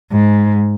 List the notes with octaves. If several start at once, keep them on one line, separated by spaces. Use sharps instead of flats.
G#2